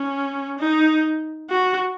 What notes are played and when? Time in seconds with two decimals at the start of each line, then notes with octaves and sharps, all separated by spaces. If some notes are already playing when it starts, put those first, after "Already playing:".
Already playing: C#4
0.59 D#4
1.50 F#4